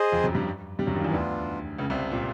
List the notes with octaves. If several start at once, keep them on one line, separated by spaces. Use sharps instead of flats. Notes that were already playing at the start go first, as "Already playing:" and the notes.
Already playing: G#4 C5 D#5
F2 F3
F#2 F#3
G2 G3
G2 G3
F#2 F#3
D#2 D#3
E2 E3
D2 D3 B3 D4 F4
C#2 C#3
C2 C3
A#2